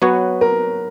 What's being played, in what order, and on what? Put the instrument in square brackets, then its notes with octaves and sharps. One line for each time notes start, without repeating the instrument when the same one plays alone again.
[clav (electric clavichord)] F#3 B3 F#4 C#5 [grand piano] B4
[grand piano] A#4